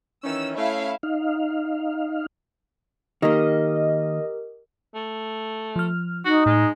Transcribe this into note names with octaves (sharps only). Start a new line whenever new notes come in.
D#3 E3 C#4 E6
A3 C#4 E4 E5 F5
D#4 F5
D#3 A#3 G4 A#4 D#5
A3
F3 F6
D#4 F#4
A2 G#3